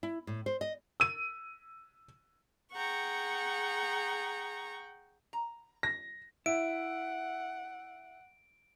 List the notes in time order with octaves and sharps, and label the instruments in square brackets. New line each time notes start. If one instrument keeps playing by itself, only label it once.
[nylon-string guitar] E4
A2
C5
D#5
[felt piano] E6 D#7
[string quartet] G#4 A#5 C#6 [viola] F#5 G5
[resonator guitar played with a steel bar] A#5
[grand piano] A#6
[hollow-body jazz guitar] E4 [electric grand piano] E5 [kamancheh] F#5 [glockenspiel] D7